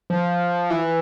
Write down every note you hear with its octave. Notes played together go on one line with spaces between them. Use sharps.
F3
E3